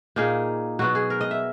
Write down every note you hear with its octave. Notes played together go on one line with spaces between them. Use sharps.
A#2 A#3 D#4 G#4
B2 F#3 B3 F#4
G#4
A#4
D#5
E5